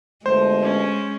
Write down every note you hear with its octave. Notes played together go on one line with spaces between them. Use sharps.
G1 B2 G#3 A3 C5
C#4